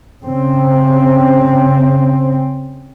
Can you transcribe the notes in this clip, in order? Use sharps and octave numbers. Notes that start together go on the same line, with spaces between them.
C#3 C4